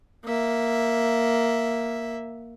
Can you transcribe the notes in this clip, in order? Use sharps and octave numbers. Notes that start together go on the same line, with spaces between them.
A#3 E5